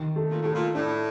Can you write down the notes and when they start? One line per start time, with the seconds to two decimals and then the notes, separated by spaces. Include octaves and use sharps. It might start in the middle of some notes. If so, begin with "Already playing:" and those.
Already playing: D#3
0.16 A3
0.31 A#2
0.42 A2 A3
0.54 A#2
0.74 A2 D4